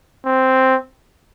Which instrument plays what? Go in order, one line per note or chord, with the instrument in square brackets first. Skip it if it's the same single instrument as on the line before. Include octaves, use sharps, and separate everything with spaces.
[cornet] C4